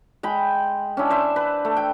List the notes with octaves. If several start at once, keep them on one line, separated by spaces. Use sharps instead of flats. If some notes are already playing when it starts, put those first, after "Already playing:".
G#3 G5 B5
C#4 D4 E4
C5 E5
B4
A3
G5